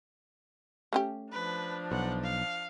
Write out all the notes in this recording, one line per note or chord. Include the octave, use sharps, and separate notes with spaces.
A3 C#4 G4
F3 D4 B4
B1 F#5
F5